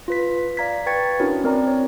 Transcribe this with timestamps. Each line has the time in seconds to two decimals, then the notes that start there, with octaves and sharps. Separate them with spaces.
0.08 F4 B4 B6
0.57 D5 F5 A#5 G#6 B6
0.86 B4 G5 C#6 G#6 A6 C#7
1.19 C#4 D4 E4 F#4 A#4 C#5
1.44 C4 A#4 D5 A#5
1.67 C#5